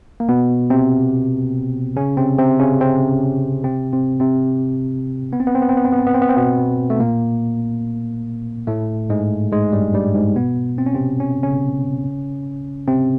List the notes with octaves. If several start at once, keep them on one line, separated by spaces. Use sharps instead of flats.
A#3
B2 B3
C3 C4
C#3 C#4
C3 C4
C3 C4
C#3 C#4
C3 C4
C3 C4
C3 C4
C3 C4
B3
C4
B3
C4
B3
C4
B3
C4
B3
C4
B3
C4
B3
C4
B2 B3
A3
A#2 A#3
A2 A3
G#2 G#3
G#2 G#3
G2 G3
G2 G3
G#2 G#3
B2 B3
C4
C#4
C3 C4
C#4
C#3 C#4
C3 C4